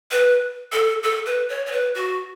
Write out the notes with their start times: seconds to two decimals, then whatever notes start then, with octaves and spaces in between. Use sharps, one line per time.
0.11 B4
0.72 A4
1.03 A4
1.26 B4
1.49 C#5
1.66 C#5
1.72 B4
1.95 F#4